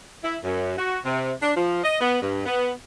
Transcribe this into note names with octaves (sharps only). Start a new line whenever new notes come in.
E4
F#2
F#4
C3
D4
F3
D#5
B3
G2
B3